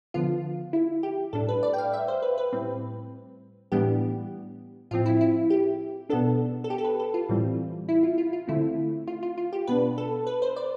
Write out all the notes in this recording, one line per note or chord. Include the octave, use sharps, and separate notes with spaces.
D3 F3 B3 F4
E4
G4
A2 G3 D4 A4
B4
D5
G5
F5
E5
C5
B4
B4
A2 G3 C4
A2 E3 G3 B3 D4 G4
A2 F3 C4 F4
E4
E4
G4
B2 B3 D4 A4
A4
G4
A4
B4
A4
F4
A2 E3 G3 C4
E4
F4
F4
F4
D3 A3 C4 E4
F4
F4
F4
G4
B2 B3 D4 B4
A4
B4
C5
D5